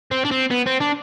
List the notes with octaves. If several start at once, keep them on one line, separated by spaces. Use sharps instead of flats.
C4
D4
C4
B3
C4
D4